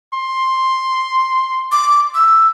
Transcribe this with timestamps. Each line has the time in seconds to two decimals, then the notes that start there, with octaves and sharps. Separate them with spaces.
0.14 C6
1.72 D6
2.14 E6